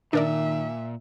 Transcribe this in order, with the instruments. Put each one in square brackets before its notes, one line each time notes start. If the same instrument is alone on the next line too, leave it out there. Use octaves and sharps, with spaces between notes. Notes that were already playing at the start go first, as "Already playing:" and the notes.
[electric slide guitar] A#2 [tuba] D#3 [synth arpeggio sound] D4 A#4 D5 [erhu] E5